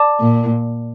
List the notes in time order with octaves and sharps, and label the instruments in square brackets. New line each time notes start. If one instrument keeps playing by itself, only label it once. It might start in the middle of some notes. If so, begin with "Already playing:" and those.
Already playing: [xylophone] D5 A5 D6
[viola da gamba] A#2